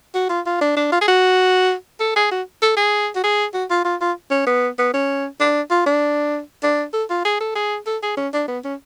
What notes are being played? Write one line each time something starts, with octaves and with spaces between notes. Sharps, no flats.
F#4
F4
F4
D4
D4
F4
G#4
F#4
A4
G#4
F#4
A4
G#4
F#4
G#4
F#4
F4
F4
F4
C#4
B3
B3
C#4
D4
F4
D4
D4
A4
F4
G#4
A4
G#4
A4
G#4
C#4
D4
B3
C#4